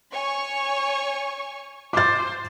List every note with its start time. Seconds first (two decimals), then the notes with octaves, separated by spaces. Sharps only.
0.13 C#5 G#5 C#6
1.93 C5 D6 A6